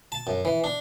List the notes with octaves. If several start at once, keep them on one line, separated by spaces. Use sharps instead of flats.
A5
F#2
E3
D4